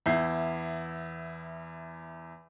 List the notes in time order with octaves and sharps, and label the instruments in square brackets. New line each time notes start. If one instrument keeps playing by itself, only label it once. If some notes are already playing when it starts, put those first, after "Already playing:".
[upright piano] E2 E4 G6 C7